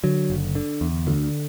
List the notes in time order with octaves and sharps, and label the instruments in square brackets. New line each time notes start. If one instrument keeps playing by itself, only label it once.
[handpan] D3 [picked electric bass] F#3
[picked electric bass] F#1
D3
E2
[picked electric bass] D2 [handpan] D3